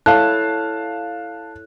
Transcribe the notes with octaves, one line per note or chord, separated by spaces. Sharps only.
E4 A4 C#5 F5 A5 F#6